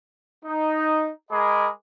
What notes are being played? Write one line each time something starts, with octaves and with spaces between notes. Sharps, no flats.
D#4
G#3 G#4 A#4 D#5 B5 D6